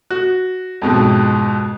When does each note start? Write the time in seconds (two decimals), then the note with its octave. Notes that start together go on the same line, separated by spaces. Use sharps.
0.10 F#4
0.82 F2 G#2 B2